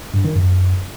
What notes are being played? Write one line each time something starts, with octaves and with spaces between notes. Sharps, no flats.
G2
D#3
F#2